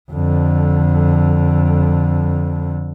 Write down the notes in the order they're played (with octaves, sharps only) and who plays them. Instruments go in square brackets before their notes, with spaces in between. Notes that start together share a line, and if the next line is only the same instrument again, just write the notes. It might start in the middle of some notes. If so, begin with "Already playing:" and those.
[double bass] F2 D3